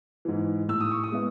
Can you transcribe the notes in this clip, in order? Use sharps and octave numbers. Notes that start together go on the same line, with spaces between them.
G#2 E3
A2 E6
D#6
C#6
D#6
G#3 B3 E4